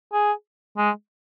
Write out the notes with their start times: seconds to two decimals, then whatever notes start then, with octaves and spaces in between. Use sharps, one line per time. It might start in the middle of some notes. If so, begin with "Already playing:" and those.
0.13 G#4
0.77 G#3